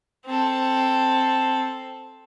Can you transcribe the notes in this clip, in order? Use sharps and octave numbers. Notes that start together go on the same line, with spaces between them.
C4 A4